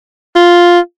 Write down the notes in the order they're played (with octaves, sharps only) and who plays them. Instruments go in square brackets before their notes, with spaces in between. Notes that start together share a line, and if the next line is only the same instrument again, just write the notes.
[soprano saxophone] F4